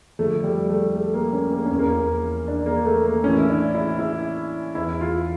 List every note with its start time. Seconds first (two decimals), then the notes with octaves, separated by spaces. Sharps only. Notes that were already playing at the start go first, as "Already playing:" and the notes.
0.19 F2 D3 A3
0.44 G3
0.69 A3
0.94 A3
1.14 A#3
1.33 C#4
1.52 A#3
1.65 C#4
1.71 E2 E3
1.79 A#3
2.48 D4
2.66 A#3
2.85 A3
3.05 A#3
3.23 A2 C#4
3.28 E3
3.38 E4
3.49 D4
3.75 E4
3.99 E4
4.75 E2 E3 E4
5.01 F4